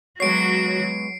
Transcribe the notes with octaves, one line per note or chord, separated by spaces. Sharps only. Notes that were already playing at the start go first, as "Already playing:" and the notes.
F#3 G#3 B3 F#4 C#5 C7 D7